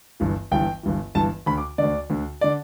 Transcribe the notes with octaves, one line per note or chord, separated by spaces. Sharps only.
G1 G2 E3
G1 G2 E3 G5
G1 G2 E3
G1 G2 E3 A5
D2 D3 B5
D6
D2 D3 D5
D2 D3
D3 D5